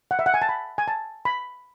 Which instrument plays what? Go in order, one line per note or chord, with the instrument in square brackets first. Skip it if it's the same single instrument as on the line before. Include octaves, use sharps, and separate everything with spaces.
[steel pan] F#5
E5
F#5
G#5
A5
B5
G#5
A5
B5